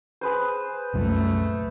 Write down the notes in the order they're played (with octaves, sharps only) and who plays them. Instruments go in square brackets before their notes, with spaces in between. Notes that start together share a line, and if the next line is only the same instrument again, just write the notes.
[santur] G#4 B4 C5
[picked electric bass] C2 F#2 A#2 [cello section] A3